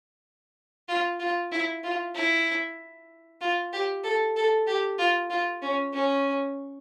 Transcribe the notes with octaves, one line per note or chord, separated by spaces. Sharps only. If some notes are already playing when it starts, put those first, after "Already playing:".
F4
F4
E4
F4
E4
F4
G4
A4
A4
G4
F4
F4
C#4
C#4